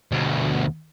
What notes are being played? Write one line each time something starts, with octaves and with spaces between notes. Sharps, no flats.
D2 B2